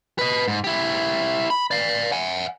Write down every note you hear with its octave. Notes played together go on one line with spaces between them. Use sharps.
B4 D#5
G#2
E4 G4
B5
D5 F5
F#5 G#5